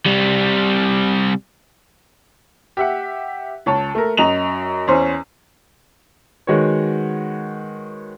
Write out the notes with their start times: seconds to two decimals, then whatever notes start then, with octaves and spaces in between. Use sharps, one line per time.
0.06 C3 G3
2.77 G4 E5 F#5
3.66 C#2 C#5 A5
3.95 A3 A#4
4.17 F#2 D#5 A#5 F7
4.87 E2 C#4 C5
6.47 D#3 G#3 F#4 B4 C#5